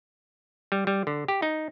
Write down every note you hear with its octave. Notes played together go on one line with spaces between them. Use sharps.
G3
G3
D3
G4
D#4